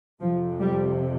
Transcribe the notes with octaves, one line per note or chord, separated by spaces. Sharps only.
F2 C3 F3
G3